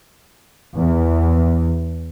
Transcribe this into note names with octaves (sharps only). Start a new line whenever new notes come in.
E2